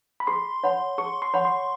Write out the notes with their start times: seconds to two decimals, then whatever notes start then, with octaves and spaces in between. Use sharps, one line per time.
0.20 B5
0.27 G#4 C6
0.63 C#5 F#5 B5
0.98 G#4 C#6
1.22 C6
1.34 C#5 F#5 B5
1.45 C6